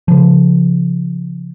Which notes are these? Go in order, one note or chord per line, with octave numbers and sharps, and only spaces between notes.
C#3 F3